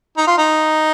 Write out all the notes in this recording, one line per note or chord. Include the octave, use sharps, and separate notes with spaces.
D#4
F4
D#4